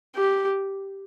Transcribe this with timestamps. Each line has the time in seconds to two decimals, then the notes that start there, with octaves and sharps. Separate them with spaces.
0.16 G4